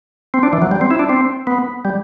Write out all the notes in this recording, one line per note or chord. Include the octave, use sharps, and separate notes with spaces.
C4
D4
E3
F#3
G3
C4
E4
D4
C4
B3
G3